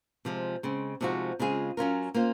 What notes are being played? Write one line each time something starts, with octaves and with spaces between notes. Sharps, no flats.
C3 F3 G#3
C#3 G#3 C4
C3 F3 G#3 D#4 F#4
C#3 G#3 C4 F4 G#4
F#3 C#4 F4 A#4
A#3 C#4 F4 C5